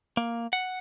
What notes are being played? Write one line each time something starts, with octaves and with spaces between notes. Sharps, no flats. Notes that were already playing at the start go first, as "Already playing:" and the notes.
A#3
F#5